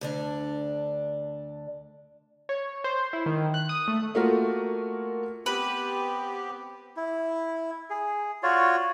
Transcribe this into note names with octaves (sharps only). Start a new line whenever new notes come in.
D2 D3 D4
C#5
C5
E4
D#3
F#6
D#6
A3
A3 A#3 F4 F#4 A#4
B3 C4 G4 B4
E4
G#4
F4 F#4 C#5 D5